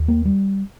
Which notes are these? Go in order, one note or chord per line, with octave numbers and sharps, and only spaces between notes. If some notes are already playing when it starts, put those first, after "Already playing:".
Already playing: D#2
A#3
G3